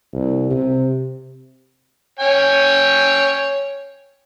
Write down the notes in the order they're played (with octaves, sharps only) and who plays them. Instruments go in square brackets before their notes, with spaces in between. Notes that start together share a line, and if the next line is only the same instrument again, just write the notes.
[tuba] C2
C3
[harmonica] C#5 G5 G#5